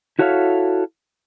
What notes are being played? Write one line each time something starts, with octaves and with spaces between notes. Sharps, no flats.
E4 F#4 A4 C#5 E5 F5